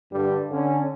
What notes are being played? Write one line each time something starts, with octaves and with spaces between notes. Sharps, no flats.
G2 D3 G3
D3 C#4